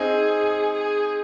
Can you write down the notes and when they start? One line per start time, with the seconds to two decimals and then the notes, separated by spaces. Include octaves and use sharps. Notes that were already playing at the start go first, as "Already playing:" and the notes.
Already playing: C4 D#4 G#4
0.73 G#4